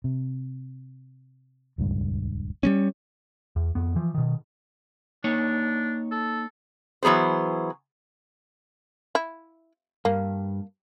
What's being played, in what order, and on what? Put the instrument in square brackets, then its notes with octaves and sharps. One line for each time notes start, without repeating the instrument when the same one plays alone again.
[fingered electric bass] C3
D#1 C#2 G2
[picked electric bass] G3 A#3 C#4
E2
F2 B3
E3 F3
B2 D#3
[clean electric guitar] A#3 D#4 C#5 [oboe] D4
[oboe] A4
[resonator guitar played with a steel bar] E3 F#3 B3 G#4 C5
[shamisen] E4
[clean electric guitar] G2 [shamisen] A#3